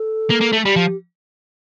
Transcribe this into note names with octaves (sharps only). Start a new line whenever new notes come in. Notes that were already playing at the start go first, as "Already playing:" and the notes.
Already playing: A4
A#3
A#3
A3
G3 G4
F3